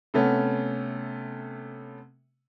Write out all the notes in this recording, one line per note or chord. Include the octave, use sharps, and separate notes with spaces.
C3 A3 B3 C#4